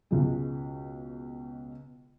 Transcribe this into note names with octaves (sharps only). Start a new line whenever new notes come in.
C#2 B2 G#3